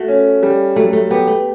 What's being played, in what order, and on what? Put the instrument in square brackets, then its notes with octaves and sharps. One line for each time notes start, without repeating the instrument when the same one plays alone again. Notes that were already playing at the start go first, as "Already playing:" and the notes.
Already playing: [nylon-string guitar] A3 [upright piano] F#4
[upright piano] C#4
G3
[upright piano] F#3 [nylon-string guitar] A3
[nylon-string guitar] A3
[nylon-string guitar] B3 [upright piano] G4
[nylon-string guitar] A3